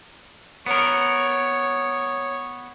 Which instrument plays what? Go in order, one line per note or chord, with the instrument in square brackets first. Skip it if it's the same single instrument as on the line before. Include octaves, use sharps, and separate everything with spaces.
[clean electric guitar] B3 A#4 [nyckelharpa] C#5